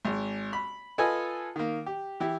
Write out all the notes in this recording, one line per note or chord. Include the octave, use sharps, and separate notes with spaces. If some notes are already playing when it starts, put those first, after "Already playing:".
G#1
B5
F4 A4 B4 D#5 G#5
D#3 A#3
G4
E3 E4 G4